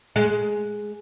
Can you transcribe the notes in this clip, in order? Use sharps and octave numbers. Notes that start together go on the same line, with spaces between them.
G#3